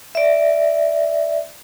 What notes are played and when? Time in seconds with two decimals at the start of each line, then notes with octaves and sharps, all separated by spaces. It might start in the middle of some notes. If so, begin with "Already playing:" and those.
0.15 D5 E5